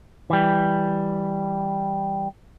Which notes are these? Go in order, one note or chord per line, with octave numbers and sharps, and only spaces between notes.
E3 G3